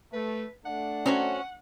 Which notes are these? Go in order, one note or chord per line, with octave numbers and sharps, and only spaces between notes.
A3 B4
A3 D4 F#5
F#3 C4 C#4 F#4